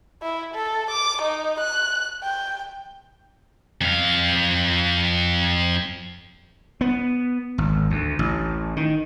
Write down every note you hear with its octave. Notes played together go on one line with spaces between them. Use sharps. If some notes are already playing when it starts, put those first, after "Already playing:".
E4
A4
D6
D#4
F#6
G5
F2 F5
B3
G#1
D2
A1
D#3